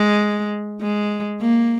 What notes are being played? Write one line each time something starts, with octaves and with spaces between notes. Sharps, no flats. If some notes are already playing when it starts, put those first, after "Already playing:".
Already playing: G#3
G#3
A#3